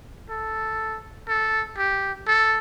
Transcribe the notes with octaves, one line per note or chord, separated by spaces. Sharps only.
A4
A4
G4
A4